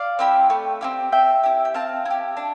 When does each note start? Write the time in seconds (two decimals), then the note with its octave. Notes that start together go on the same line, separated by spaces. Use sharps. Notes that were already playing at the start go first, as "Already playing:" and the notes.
Already playing: D5 F5
0.19 C4 E4 G4
0.50 A3
0.81 C4 E4 G4
1.12 C4 E5 G5
1.43 E4 G4
1.65 G5
1.74 C4 F5 A5
2.05 E4 G4
2.37 D4